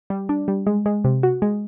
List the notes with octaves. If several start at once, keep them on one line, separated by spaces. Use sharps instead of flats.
G3
D4
G3
G#3
G#3
C3
F#4
G#3